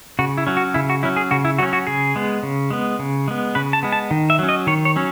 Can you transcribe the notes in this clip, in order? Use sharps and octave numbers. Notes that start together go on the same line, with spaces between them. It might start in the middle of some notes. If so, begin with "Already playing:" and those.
C#3 F#4
E4
F#3 C#4
F#4
C#3 E4
F#4
F#3 C#4 E4
G#4
C#3 F#4
E4
F#3 C#4 F#4
F#4
C#3 G#4
G#3 B3
C#3
G#3 B3
C#3
G#3 B3
C#3 B4
A5
G#3 B3
A5
D#3
E5
F#3 C#4
D#5
D#3 C#5
C#5
F#3 C#4